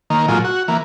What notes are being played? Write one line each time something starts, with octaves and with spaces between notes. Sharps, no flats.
D#3 A#3
A#2 F#3 G#3 F4
F#4
E3 A#3